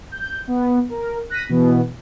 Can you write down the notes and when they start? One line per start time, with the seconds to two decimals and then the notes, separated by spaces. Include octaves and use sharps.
0.12 G6
0.48 B3
0.90 A#4
1.30 F#6 A#6 B6 D#7
1.49 B2 E3 B3